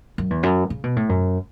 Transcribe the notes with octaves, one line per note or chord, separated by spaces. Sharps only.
F#2
E2
F#2
C#3
B2
A2
F#2